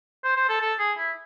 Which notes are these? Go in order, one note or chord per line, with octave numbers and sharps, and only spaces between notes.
C5
C5
A4
A4
G#4
E4